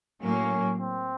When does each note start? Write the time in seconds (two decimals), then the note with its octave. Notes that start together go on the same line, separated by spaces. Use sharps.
0.22 A2 F#3 A#3 C#4
0.80 C4